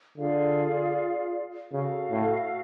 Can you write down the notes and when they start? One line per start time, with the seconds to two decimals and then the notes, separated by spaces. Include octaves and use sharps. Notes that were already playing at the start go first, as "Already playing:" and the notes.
0.17 D3 F4 G#4 D5 F5
1.72 C#3 F#4 A4 F5
2.11 A2